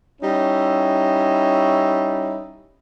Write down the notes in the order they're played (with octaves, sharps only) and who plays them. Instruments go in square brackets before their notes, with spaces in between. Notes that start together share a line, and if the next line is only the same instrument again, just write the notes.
[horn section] G3 C#4 D#4 E4